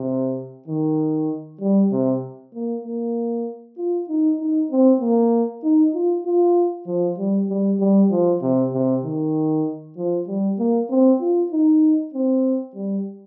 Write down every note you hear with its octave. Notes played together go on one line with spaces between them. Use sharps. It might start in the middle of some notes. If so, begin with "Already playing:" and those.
Already playing: C3
D#3
G3
C3
A#3
A#3
F4
D#4
D#4
C4
A#3
D#4
F4
F4
F3
G3
G3
G3
F3
C3
C3
D#3
F3
G3
A#3
C4
F4
D#4
C4
G3